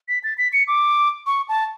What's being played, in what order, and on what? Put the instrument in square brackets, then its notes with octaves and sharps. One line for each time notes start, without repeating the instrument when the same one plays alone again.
[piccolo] B6
A6
B6
C#7
D6
C#6
A5